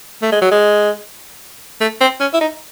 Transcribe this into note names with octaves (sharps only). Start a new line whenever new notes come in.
A3
G#3
F#3
G#3
A3
C4
C#4
E4
D#4